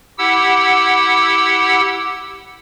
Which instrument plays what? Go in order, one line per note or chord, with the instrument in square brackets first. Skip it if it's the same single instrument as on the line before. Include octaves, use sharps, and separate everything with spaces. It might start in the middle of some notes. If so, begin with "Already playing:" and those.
[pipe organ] E4 G4 F#5 E6